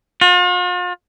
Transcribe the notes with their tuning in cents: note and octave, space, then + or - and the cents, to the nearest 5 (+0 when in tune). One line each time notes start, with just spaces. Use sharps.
F4 +45